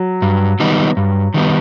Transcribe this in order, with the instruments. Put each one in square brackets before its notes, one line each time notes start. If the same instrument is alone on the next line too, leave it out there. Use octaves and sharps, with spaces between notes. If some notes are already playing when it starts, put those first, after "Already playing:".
Already playing: [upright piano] F#3
[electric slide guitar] G2
D#3 G3 B3 D#4
G2
D#3 G3 B3 D#4